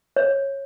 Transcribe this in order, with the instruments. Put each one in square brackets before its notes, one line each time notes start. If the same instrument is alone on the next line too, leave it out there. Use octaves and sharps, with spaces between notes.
[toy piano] C#5